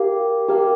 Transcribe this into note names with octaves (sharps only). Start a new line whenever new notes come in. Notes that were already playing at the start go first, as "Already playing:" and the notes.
Already playing: G4 A#4 F5
G4 A#4 F5